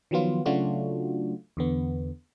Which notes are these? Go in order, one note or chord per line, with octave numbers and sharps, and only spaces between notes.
D#3 F3 F#3 B3 F4
C#3 F#3 A3 D4 F4 F#4
E2 D3 B3